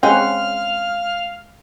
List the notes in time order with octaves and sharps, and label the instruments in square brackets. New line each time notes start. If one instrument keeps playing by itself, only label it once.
[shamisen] G#3 C4 [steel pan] C#4 F#5 [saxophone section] F5 [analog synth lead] F6